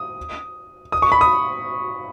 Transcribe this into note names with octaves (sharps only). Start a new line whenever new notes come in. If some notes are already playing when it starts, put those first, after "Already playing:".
Already playing: D#6
D#6
C#6
B5
D#6